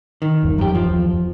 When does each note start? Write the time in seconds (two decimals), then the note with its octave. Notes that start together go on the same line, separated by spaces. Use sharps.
0.22 D#3
0.43 E1 E2 G2
0.58 F#2 G4
0.75 F3
0.89 E2
1.06 F2